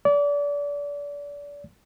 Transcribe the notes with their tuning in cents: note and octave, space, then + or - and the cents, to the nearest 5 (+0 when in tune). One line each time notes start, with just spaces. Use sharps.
D5 -30